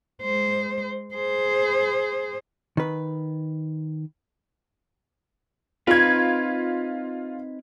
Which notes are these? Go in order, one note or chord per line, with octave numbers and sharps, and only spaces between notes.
G#3 C5
G#4 C5
D#3 B4
C4 D#4 F4 B4 G#6